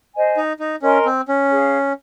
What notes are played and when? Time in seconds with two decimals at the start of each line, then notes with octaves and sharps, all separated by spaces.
0.14 C5 D#5 G#5
0.37 D#4
0.60 D#4
0.82 C#4 A#4 D#5 G#5 C6
1.05 C4
1.28 C#4
1.51 G#4 C#5 F5